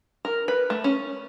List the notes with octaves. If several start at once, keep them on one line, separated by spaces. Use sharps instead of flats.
A#4
B4
A3
C#4